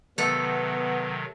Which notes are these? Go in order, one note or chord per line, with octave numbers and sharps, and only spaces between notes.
C3 D#3 F#3 A3 B3 A4